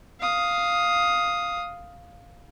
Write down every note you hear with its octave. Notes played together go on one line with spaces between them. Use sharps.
F5 D#6